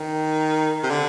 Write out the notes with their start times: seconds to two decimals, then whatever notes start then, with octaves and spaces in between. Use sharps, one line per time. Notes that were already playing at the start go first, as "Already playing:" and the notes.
Already playing: D#3
0.83 C3
0.90 D3